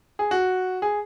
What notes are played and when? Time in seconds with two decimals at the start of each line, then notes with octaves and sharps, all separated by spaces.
0.19 G#4
0.31 F#4
0.82 G#4